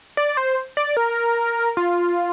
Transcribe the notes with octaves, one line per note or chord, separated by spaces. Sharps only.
D5
C5
D5
A#4
F4